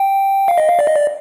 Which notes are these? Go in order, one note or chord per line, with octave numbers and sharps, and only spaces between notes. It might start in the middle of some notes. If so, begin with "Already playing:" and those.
Already playing: G5
F5
D#5
F5
D5
D#5
D5